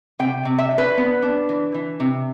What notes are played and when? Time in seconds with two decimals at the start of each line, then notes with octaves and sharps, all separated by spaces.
0.19 C3 G5
0.45 C3
0.58 E5
0.71 D4
0.78 B4
0.98 B3
1.22 D4
1.49 E3
1.74 E3
2.00 C3